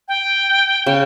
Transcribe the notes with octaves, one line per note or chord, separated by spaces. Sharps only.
G5
C#3